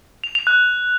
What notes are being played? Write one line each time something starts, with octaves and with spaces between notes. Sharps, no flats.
F7
F7
F#6